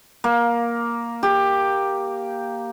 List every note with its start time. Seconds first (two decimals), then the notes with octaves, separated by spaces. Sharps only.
0.24 A#3
1.23 G4